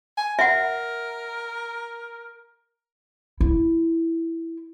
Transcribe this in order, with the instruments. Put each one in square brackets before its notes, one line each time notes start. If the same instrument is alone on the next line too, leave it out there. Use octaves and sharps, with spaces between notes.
[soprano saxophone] G#5
[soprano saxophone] A#4 [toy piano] E5 F#5
[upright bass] E4